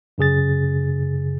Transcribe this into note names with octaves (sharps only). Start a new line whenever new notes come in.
F#2 C#3 G#4 A6